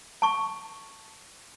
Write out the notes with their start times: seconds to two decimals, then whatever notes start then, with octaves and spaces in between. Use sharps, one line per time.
0.22 A5 C#6